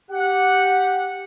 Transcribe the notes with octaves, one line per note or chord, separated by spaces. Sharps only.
G4 F#5